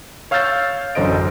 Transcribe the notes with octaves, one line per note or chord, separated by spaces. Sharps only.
C#5 F5 E6 F6 G6 A6
A1 F#2 D3 C5 D#5 D7